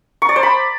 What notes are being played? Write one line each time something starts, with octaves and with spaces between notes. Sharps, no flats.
C#6
D5
C5
B5